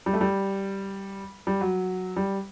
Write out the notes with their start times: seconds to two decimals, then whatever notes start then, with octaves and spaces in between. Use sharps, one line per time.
0.06 G3
0.13 A3
0.21 G3
1.47 G3
1.61 F#3
2.16 G3